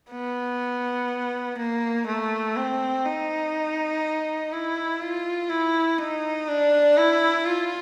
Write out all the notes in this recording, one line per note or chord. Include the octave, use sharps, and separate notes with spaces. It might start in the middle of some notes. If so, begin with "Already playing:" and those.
B3
A#3
A3
C4
D#4
E4
F4
E4
D#4
D4
E4
F4